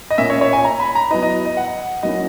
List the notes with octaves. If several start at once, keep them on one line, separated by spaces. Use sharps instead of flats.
D#5
A#2 A#3 C#4 E5
C#5
C#5
G#5
A#5
B5
A#5
F#3 B3 E4 D#5
D#5
D#5
F#5
F#3 A#3 C#4 E4 D#5